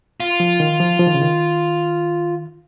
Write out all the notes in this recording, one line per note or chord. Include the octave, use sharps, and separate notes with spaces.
F4
F3
D#3
F3
F3
D#3
C#3
D#3